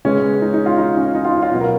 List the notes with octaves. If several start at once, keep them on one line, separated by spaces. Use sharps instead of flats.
C#3 G#3 B3 C#4
D#4
D#4
F4
D#4
C#4
D#4
F4
D#4
F4
B2 F#3 B3 F#4
A#4